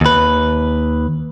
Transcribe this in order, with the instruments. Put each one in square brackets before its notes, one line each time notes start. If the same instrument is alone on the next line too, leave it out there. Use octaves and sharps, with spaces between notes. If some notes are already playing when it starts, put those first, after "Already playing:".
[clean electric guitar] D#2 B4